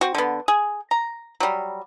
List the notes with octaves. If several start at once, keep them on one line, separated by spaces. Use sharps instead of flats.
C4 F#4
D3 B3
G#4
A#5
F#3 G3